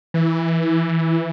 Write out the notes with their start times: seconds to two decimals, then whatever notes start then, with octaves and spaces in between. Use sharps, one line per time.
0.14 E3